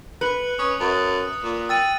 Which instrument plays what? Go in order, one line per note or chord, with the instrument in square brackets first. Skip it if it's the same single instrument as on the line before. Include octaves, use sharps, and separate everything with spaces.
[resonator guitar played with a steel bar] B4 [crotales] F#6 C#7 F#7
[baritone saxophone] C#4 [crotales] D#6
[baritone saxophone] F#2
A#2
[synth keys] G5 [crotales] E6 A6 D#7